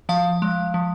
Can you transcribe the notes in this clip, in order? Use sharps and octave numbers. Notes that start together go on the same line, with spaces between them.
F3 F5
G#3
F3